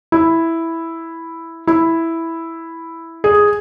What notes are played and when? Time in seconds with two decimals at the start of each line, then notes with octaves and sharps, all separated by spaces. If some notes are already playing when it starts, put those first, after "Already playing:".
0.12 E4
1.67 E4
3.24 G#4